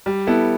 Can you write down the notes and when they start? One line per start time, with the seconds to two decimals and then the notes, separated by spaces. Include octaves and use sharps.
0.06 G3
0.27 B3 E4 A4